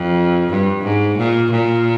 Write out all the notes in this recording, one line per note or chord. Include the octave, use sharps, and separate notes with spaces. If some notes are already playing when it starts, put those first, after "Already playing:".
Already playing: F2
G2
G#2
A#2
A#2